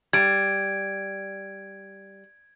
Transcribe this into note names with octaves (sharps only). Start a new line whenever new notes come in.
G3 G#6 D7